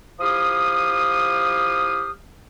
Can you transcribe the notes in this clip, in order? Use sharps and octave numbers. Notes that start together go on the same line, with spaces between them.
F3 E4 G4 F5 D#6